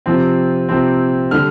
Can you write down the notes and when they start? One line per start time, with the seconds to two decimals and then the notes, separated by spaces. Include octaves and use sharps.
0.06 C3 F3 C4
0.69 C3 F3 C4
1.31 D3 G3 F6